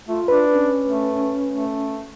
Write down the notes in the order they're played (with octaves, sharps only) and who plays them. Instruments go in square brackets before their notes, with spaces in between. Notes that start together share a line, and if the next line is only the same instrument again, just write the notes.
[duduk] A3 [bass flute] F4
[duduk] D4 [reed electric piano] B4
[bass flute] C#4
[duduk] A3
A3